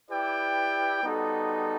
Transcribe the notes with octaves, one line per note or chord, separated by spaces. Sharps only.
E4 G4 B4 D5 G5
G3 B3 D#4 F#4 A4